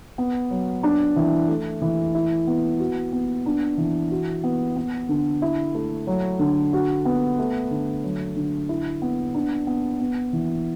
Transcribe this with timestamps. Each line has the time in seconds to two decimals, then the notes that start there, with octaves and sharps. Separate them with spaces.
0.18 B3
0.51 F#3
0.83 D4
1.16 E3
1.49 A3
1.82 E3
2.14 E4
2.47 B3
2.79 F#4
3.12 B3
3.46 D4
3.78 E3
4.11 F#4
4.44 B3
4.76 B3
5.09 D3
5.42 E4
5.74 A3
6.07 F#3
6.39 D3
6.73 F#4
7.05 B3
7.39 A3
7.71 D3
8.04 F#3
8.36 D3
8.69 E4
9.02 B3
9.34 D4
9.67 B3
10.00 B3
10.33 E3